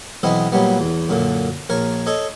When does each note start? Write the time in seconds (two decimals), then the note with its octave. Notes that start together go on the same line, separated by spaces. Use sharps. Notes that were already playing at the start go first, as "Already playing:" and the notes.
0.23 B1 E3 B3 C4 D#5
0.52 A#2 F#3 G3 B3
0.80 E2
1.09 F#2 A#2 D3
1.70 A#1 A#4 C#5
2.07 A4 C#5 D#5